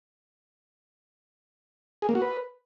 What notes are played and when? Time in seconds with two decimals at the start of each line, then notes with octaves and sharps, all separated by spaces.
2.02 G#4
2.09 A#3
2.15 F#4
2.22 B4